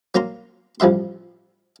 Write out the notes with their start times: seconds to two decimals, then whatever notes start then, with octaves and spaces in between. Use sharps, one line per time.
0.15 F#3 A#3 A#5 C6
0.80 A1 F3 G3 E5 C6